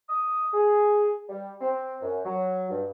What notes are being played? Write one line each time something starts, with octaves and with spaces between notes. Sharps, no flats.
D#6
G#4
G3
C4
F#2
F#3
G2